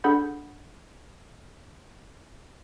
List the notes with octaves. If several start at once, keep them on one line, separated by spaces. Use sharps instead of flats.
D4 G#4 A4 F#5 B5 G6